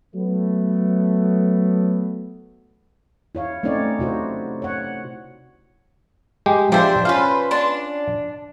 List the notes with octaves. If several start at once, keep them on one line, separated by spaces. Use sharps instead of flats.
F#3 A3 B3
E4 C#5 F5
A3 C4 C#4 D#4 C#5 D5
C3 E4 F#4 C5
C#5 F#5
G#3 G4
F3 D4 G4 C5 E5
C#4 F4 B4 C5 F5
D4 A5 C6